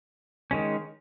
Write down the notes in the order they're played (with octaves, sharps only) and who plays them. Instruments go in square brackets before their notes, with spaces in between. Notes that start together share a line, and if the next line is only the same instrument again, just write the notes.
[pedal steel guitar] D#3 G#3 C#4